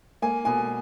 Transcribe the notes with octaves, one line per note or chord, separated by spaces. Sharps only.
A#3 G#5
B2 G#5